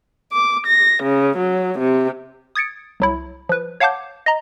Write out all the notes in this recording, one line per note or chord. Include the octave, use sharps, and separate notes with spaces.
D6
A#6
C#3
F#3
C3
D#6 G#6 A6 C#7 D7
C2 F#3 E4
F3 B4
C#5 F5 F#5 A5 D6 G6
D#5 A#5